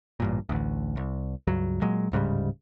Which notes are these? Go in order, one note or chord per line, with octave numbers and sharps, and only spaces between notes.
A1 G2 A#2
A1 D2
C2
C#2 G2 F#3
A#2 F#3 G#3
D1 G#2 C#3 G3